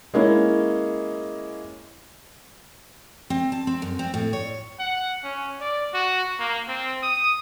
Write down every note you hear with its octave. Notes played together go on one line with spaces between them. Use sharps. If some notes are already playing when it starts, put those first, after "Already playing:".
G#3 A#3 C#4 E4
C4
A5
C4
F#2
C4
A2
C#5
F#5
C#4
D5
F#4
A#3
C4
D#6